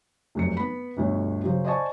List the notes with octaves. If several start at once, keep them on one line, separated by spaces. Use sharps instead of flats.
F1 F#2 C#7
B3 B5
G1 D2 B2 C#5
C#3 F#3 C5
C5 D5 D#5 G#5 A5 C#6